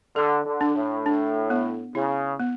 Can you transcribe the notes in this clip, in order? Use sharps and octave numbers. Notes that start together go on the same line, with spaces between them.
D3 A4
D3
D4
A2
D4
B3
C#3 E4
B3